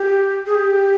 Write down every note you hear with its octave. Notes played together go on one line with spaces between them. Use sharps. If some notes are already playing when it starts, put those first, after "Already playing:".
Already playing: G4
G#4
G4